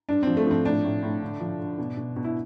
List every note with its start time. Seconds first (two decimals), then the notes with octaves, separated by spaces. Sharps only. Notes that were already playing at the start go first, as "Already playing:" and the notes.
0.09 G2 D4
0.23 F3 C4
0.37 A3
0.47 F3 C4
0.65 A2 D4
0.84 A2
1.03 A2
1.22 D3
1.40 F3
1.59 D3
1.78 B2
1.97 B2
2.16 B2
2.24 E4